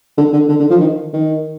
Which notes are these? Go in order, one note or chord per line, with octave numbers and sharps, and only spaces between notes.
D3
D3
D3
D3
F3
D#3
D#3